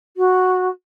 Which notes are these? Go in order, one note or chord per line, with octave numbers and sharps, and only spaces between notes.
F#4